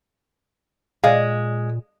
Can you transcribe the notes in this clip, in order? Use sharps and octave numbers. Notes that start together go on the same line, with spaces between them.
A#2 G#3 D5 F5